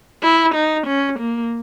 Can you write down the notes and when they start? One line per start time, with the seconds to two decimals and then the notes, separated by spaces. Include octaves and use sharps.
0.23 E4
0.54 D#4
0.86 C#4
1.19 A#3